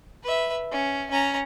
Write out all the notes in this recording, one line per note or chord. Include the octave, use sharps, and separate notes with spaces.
B4 E5
C#4
C#4 A#5